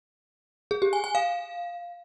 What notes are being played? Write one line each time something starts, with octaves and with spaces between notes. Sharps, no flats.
G#4
G4
G#5
G#5
F5